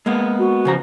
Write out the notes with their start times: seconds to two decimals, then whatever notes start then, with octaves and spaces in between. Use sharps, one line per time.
0.06 G#3 A#3 B3
0.39 F#4
0.65 C#3 F3 A#5